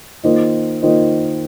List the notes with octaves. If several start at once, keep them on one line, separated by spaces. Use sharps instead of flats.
D#3 A#3 F4 C5 D#5
D#3 A#3 F4 C5 D#5